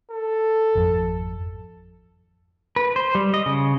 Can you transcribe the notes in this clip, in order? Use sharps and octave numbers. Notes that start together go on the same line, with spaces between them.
A4
G#1 F2 F3
B4
C5
G3
D#5
C#3